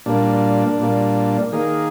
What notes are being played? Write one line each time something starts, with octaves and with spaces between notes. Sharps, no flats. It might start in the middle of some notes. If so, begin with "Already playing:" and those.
A#2 G3 A#3 D4
A#2 G3 A#3
D#3 A#3 G#4